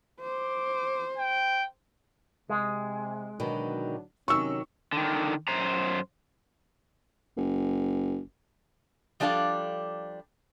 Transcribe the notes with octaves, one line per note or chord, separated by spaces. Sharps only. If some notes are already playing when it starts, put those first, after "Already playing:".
C5 D6
G5
C3 G#3
B2 D3 D#3 F#3 D4
C3 D#3 F#3 C#4 C#6 E6
D3 D#3
F#2 C5 A#5
F#1
F3 G3 D4 A4 F5